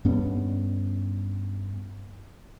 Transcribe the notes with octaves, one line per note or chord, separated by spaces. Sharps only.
G2 B3 C#4